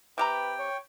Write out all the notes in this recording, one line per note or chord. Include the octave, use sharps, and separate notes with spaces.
C3 G4 B4 G5 A#5
C#5